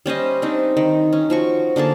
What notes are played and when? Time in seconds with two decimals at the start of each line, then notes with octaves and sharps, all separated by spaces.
0.06 G3 C#4 C5 D#5
0.42 C4 D4 D#4
0.77 D#3
1.13 C#4
1.30 F3 F#4 C#6
1.76 D3 A#3 G#4 A5